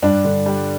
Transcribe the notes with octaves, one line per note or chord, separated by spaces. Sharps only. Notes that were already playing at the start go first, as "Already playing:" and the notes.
G2 D4
D3
G3